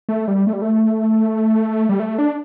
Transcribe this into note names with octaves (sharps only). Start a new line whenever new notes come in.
A3
G3
A3
G3
A3
G3
A3
D4